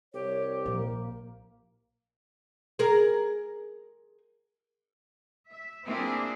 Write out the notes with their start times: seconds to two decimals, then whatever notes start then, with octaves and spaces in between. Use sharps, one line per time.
0.14 C2 G4 C#5
0.66 A#1 A#3
2.79 G#4 A#4
5.50 E5
5.85 A#3 C4 D4 E4 F4 G#4